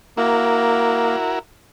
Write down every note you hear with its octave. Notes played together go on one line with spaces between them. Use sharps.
A#3 E4 F#4 A#4